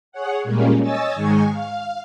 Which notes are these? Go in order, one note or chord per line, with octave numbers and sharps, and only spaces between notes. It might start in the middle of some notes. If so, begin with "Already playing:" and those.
G#4 C#5 F#5
A#2 G3 G#3 A#3 C#4
C#5 D#5 G#5 E6 A6
G#2 D#3 G#3 G#5 C#6
F5